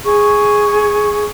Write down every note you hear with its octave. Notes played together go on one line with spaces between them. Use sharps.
G#4 C#6